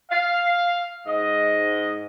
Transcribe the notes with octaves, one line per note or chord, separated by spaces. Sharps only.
F5
G#2 D#5